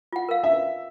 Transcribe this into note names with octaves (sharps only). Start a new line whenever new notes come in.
F4 F#5
A#4 F5
E5